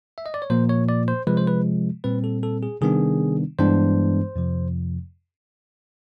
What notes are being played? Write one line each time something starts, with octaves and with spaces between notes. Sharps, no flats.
E5
D#5
D5
C#5
A#2 F3 A#3 C5
C#5
D5
C5
C3 F3 G#3 B4
C5
B4
A#2 G3 C4 B4
A4
A4
G#4
C3 D#3 G3 B3 D4 G#4
G2 E3 G#3 B3 D4 C5
F2 C3 F3